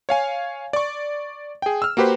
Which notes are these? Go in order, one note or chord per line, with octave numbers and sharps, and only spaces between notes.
C#5 F5 G#5
D5 C#6
G#4 G5
E6 F6
A#3 F#4 G4 B4 C5